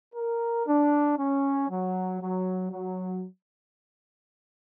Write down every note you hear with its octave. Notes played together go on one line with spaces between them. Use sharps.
A#4
D4
C#4
F#3
F#3
F#3